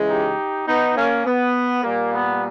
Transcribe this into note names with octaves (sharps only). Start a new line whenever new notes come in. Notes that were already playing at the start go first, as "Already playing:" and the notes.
Already playing: C#3 E3 G#3
D#4 G4
B3 D#4
A#3 C#4
B3
A#2 G3 A#3
B3